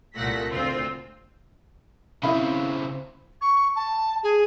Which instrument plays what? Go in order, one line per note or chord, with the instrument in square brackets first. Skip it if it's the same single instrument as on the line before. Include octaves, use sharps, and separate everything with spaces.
[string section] C2 A#2 A3 F#5 A#6 B6
D2 C4 F4
[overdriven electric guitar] C#3 C4 [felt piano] E4 F5 B5
[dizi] C#6
A5
G#4